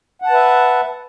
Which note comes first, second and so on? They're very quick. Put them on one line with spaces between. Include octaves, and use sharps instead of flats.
F#5 A5 B4 E5